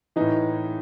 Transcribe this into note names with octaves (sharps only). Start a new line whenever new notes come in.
A2 E3 D#4